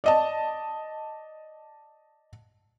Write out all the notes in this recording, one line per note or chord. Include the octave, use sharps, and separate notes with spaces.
D5 D#5 A5